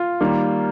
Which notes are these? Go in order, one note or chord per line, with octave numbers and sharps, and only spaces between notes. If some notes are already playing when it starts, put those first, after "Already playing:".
Already playing: F4
D#3 G3 A#3